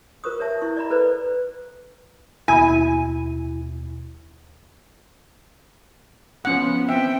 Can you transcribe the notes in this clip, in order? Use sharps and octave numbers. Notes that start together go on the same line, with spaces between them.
F4 A#4 C5 C#6 D#6
A#4 C#5 E5 A5
E4 C#5 C#6
D5 D#5 A#5 B5
A4 B4 C5 D5
D#2 B2 E4 G#5
F3 B3 C#4 F#5
C4 E5 G5